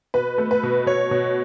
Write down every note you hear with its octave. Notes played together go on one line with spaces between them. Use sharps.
B2 B4
A3
B4
B2
B2 C#5
B2